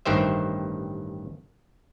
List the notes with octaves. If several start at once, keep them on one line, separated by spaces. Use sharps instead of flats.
A1 G2 D#3 G4 C5 E5